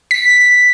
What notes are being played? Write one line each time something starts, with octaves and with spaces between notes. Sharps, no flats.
B6